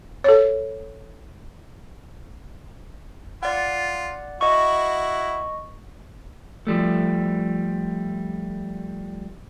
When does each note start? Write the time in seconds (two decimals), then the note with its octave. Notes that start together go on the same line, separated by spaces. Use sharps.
0.24 A4 C#5
3.43 F4 D5 F#5
4.41 E4 F#4 D#5 C#6
6.67 F3 G3 A3